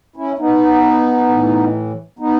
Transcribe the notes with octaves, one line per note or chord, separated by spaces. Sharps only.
C#4 E4
B3 D#4
A2 E3
B3 D#4